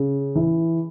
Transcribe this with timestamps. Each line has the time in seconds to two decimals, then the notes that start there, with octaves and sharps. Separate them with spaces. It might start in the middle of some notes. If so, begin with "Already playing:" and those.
Already playing: C#3
0.35 E3